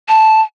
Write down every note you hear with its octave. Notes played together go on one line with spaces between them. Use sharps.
A5